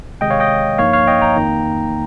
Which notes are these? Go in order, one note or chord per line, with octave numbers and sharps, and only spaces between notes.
C3 D#3 G#3 D#5 G5
C#5 F5
D#5 G5
G2 F3 A#3 D#4 C#5 F5
C#5 F5
D#5 G5
G5 A#5
F2 D#3 A#3 D#4